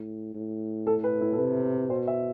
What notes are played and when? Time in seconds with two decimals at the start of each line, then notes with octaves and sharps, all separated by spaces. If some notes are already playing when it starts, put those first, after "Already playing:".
Already playing: A2
0.34 A2
0.87 A4
1.04 B4
1.21 E4
1.33 A4
1.38 C3 B4
1.89 B2 C5
2.07 E5